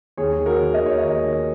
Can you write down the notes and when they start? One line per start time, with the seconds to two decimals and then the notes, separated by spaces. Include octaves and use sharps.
0.17 D#2 G#4 C#5
0.39 D#3
0.46 F#4 A#4
0.60 D#3
0.74 D#5
0.81 D#2
0.86 C#5
0.98 D#2 A#4 D#5
1.24 D#3